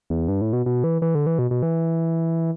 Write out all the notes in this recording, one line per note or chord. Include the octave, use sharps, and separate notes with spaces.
E2
G2
A2
B2
B2
E3
E3
D3
E3
B2
B2
E3